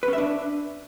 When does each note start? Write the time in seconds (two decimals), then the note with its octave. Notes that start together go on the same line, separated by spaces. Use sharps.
0.03 B4
0.08 C#4
0.13 E5
0.18 D4